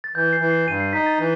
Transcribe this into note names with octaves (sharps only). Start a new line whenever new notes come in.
A6
E3 G6
C7
E3
C7
G2 D#7
C7
D#4 B6
A6
E3